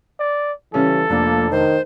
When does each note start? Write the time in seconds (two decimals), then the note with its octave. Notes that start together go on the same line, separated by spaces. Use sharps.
0.20 D5
0.74 C#3 E3 G3 C#4 A4
1.10 F1 F3 A#3 D4
1.51 D#3 C5